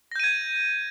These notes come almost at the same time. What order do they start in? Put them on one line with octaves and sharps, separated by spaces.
A#6 G6 D#7 G#6